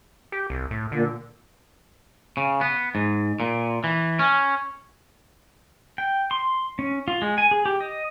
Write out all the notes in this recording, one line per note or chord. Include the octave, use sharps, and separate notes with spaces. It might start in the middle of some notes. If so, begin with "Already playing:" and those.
G4
C2
A2
A#2 D3
C#3
B3
G#2
A#2
E3
C#4
G5
C6
C#4
F4
G#3
G#5
G#4
G4
D#5